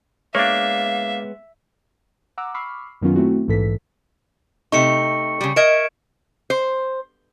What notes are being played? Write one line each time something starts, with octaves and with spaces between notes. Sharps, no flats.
G#3 A#3 B3 D4 C#5 E5 F5
F#5 A#5 D6 E6 F#6
B5 C#6 D6 E6 F6 C7
F#2 D#3 F#3 B3 C#4 F4
A3 C4 E4 F#4
A#1 G#2 E3 A4 B6
C3 A3 D#4 C#6 C#7
C#3 G3
A#4 D#5 E5 G#6 D7 E7
C5